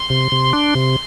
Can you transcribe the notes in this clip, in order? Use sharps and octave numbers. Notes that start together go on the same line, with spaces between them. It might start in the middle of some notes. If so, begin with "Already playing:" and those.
Already playing: C6
C3
C3
D4
C3